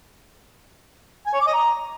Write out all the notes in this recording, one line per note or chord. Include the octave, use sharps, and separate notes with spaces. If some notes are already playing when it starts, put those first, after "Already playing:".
G#5
C#5
D6
D#5
A#5